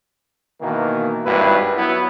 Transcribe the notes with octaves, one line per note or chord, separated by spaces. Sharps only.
B2 D#3 E3 A#3
G#1 G2 E4 F#4 B4
F#3 B3 E4